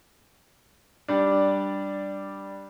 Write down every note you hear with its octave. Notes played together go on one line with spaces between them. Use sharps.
G3 D4